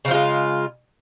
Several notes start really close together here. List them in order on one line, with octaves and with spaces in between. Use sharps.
C#3 F3 F4 G#3